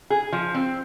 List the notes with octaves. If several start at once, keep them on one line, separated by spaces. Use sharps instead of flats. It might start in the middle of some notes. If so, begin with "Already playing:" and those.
G#4
F3
C4